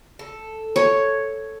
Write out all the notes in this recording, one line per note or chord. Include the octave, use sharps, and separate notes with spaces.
A4
C#5